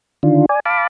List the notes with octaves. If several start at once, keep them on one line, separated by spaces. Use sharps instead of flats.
D3 D#3 D4 F4
D5 G#5
F5 A5 B5 D6